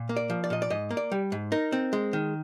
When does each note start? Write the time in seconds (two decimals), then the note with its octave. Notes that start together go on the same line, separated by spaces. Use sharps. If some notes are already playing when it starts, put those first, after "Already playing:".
Already playing: A#2
0.09 A#3
0.17 D5
0.30 F3
0.44 D5
0.50 A#2 D#5
0.62 D5
0.70 G#2 D#5
0.91 A#3
0.97 D5
1.12 G3
1.32 G#2
1.52 D#4 A#4
1.72 C4
1.93 G#3
2.13 D#3